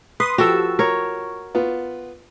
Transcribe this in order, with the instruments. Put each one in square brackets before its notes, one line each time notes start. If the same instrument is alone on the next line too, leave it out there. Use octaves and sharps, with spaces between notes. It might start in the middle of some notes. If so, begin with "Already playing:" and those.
[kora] B4 [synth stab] C6 D#6
[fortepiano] F3 [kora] F#4 A4 [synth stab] G4 E6
[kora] A#4 C#5
[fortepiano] B3 F4